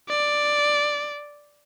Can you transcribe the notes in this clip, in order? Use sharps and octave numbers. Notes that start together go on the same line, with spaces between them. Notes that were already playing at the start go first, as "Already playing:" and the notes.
D5